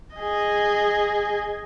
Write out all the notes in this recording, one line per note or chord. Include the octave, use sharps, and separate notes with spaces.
G#4 D#5